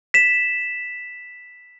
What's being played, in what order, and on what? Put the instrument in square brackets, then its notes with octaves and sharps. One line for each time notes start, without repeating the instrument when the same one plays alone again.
[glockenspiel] B6 E7